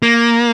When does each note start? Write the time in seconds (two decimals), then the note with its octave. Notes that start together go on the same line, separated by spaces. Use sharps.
0.02 A#3